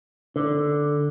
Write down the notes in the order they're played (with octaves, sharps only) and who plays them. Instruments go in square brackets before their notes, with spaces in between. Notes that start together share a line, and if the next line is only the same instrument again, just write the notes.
[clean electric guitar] D3